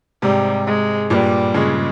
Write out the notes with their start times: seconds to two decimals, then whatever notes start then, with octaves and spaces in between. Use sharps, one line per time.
0.22 G#2 C3 G3
0.67 G#3
1.10 G2 A#2 G3
1.54 A#2 C#3 G#3